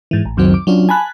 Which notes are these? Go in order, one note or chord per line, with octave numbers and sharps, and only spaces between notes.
G#2 E3
A1
C#2 F#2 D#3 F#3 C4
D6
F#3 C#4 D4 F4
G#5 A5 B5 F#6